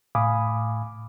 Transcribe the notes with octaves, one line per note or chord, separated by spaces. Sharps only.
A2 F5 G#5 B5 D6 D#6